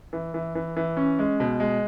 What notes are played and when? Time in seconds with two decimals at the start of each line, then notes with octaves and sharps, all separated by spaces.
0.13 E3
0.34 E3
0.55 E3
0.77 E3
0.97 C#4
1.19 G#3
1.40 B2
1.60 G#3